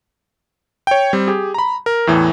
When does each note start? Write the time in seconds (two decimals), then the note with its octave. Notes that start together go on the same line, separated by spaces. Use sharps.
0.87 C#5 G5
1.13 G3 C4
1.27 G4 G#4
1.54 A#5 B5
1.86 A#4
2.07 E2 A2 E3